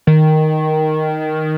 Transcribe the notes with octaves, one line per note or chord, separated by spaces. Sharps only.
D#3